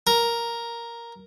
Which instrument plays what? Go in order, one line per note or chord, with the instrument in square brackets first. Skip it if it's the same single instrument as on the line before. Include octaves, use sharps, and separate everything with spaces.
[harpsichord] A#4